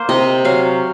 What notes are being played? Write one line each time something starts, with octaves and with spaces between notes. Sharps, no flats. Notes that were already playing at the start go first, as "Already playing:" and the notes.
Already playing: A#3 C5
C3 D#5
F#3 F5